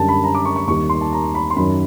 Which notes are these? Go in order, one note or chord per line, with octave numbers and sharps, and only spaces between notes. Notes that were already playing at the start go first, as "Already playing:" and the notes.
Already playing: F#2 D3 G3 A5
B5
A#5
D6
C#6
C#6
D#2 D#3 G3 C#6
C6
A5
A#5
B5
C6
F#2 D#3 F#3 B5